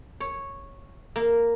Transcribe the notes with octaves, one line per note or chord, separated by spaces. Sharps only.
C#5
A#3